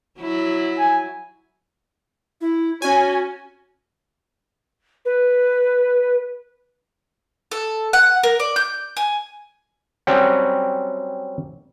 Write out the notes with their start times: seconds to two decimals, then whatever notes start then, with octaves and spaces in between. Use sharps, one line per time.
0.20 F#3 E4
0.78 G#5
2.41 E4
2.82 C#4 F#4 G#5
5.05 B4
7.51 A4
7.93 F#5
8.23 A#4
8.40 D5
8.56 G6
8.97 G#5
10.07 F#3 G3 C4 C#4